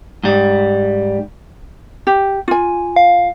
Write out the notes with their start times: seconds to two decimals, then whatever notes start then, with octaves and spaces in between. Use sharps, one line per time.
0.24 G#2 G3
2.07 G4
2.48 F4 G#5
2.96 F5